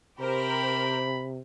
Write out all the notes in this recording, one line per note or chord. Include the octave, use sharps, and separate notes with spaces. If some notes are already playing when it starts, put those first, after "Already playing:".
C3 G4 A#4 C5 B5